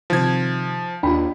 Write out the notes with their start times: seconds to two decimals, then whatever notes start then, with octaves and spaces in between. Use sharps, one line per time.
0.10 C3 D#3 F3 G#6
1.03 D#2 D4 F4 G5 B5